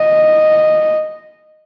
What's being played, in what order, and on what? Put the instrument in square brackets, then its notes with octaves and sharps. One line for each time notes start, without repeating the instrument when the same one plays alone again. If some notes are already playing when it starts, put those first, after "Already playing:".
Already playing: [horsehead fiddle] D#5